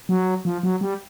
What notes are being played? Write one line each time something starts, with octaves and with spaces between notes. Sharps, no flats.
F#3
F3
F#3
G3